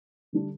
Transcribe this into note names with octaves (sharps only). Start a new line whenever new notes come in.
D3 G3 D4